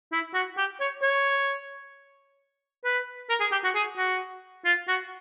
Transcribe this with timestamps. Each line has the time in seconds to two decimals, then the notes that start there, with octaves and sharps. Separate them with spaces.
0.12 E4
0.34 F#4
0.57 G4
0.80 C#5
1.02 C#5
2.84 B4
3.29 A#4
3.40 G#4
3.52 G4
3.64 F#4
3.75 G#4
3.97 F#4
4.65 F4
4.88 F#4